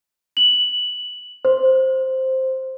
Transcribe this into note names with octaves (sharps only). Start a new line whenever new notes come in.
F#7
C5